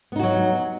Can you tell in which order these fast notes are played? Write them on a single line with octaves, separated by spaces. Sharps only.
B3 D#4 F#4 F#3